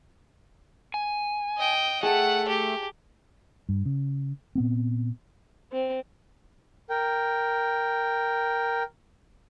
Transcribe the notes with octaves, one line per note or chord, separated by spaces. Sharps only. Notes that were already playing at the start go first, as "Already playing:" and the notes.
G#5
D#5 G5
A3 G#4 F#5 G5 A5
G4
G2
C#3
A#2 B3 C4
C4
A#4 G5